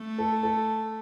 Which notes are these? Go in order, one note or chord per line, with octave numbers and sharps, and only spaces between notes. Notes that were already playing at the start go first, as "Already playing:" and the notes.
Already playing: A3
A4
A4